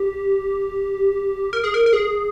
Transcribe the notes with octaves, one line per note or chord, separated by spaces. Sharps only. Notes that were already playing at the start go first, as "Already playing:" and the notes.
Already playing: G4
A#4
G#4
A#4
A#4
G#4